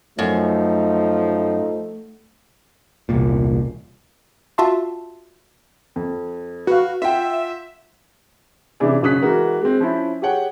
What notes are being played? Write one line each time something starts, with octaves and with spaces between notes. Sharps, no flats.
F#2 F3 A3 D#4
E1 C2 A#2
F4 F#4 E5 A5 C6
F2
F#4 B4 F5
F4 E5 F#5 G5
C3 E3 C#4 D4 E4 G#4
F#1 C#3 C#4 D#6 F#6 B6
E3 G#3 F#4 A#4
G#3 C4
F3 C#4 E4 B5
G4 G#4 C#5 F#5 G5